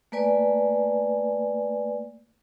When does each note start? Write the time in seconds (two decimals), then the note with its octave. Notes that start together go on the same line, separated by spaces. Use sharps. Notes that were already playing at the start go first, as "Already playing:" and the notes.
0.12 A3 A#3 B4 D5 G#5